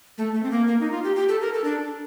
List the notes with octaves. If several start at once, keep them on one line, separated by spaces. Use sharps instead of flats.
A3
A3
C4
A#3
A#3
D#4
F4
G4
G4
A4
A#4
A4
D4